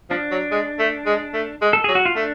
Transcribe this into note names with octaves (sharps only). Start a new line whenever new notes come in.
F3 D4
F#3
G#3
A3
G#3
A3
G#3
A4
F#3 G#4
F#4
F4
A3 D4